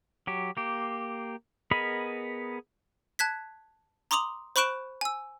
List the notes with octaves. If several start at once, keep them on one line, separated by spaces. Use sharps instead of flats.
F#3 G4
A#3 G4
B3 G#4 A#4 D#5 B5
A5 F#6 G#6 B6
A#5 C6 D6 D#6 F7 F#7
C5 B5 C#6 F#6 D7 E7
G#5 E6